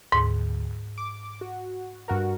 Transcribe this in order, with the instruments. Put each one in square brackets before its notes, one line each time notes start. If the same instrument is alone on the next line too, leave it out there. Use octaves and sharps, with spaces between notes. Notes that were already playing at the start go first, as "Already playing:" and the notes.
[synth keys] D2 [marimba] G#2
[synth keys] D6
F#4
G2 F#4 A#4